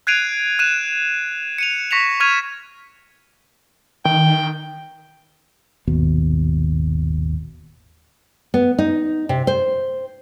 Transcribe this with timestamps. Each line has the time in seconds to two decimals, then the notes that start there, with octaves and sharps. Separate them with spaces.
0.07 F#6 G#6 C7 D7 D#7 F7
0.59 F#6 D#7 E7
1.58 C#7 D#7 F7
1.91 C#6 A#6 B6 C#7 E7 F7
2.20 C#6 F6 G#6 D#7 F7
4.05 D#3 G5
5.87 D#1 G#1 D#2 B2
8.54 B3
8.78 D#4
9.29 C3
9.47 C5